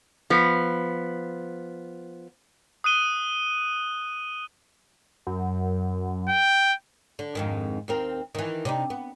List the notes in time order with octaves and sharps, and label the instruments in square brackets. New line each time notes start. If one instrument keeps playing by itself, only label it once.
[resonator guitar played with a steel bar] F3 B3
[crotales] D#6 F#6 D#7 G7
[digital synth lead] F#2
[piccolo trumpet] G5
[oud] D3
F2 G#2 D#3
D#2 C4 A#4
D#3 E3
C3 D4 D#4
B3